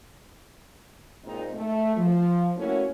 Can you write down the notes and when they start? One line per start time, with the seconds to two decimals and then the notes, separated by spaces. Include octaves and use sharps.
1.25 A#2 G#3 C4 D#4
1.55 A3
1.96 F3
2.57 A3 A#3 C#4 E4 F#4 A4